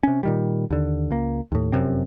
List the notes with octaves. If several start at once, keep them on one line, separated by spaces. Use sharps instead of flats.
C3 C#4
A#2 D#3 G3
D#2 D3
C#2 A#3
D#2 A2
F1 F#2 C3 C4